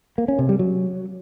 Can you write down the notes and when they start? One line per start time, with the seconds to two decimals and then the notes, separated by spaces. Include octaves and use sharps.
0.18 A#3
0.28 C#4
0.39 C3
0.49 G3
0.59 F#3